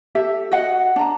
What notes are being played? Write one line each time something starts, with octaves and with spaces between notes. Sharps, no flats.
G4 A4 E5
F#4 D#5 F#5
D4 A#5